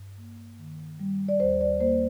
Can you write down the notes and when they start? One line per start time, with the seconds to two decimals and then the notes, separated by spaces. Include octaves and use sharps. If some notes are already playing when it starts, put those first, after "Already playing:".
Already playing: G2
0.18 A#3
0.59 D#3
1.00 G3
1.29 D5
1.40 D#2 C5
1.61 D5
1.80 A#3 C5